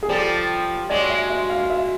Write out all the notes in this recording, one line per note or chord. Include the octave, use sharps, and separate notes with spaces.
G#4
F3 G3 A4
F#3 G#3 D5
E5
E5
F5
E5